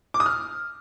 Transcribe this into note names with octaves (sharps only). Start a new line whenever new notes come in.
D6
D#6
F6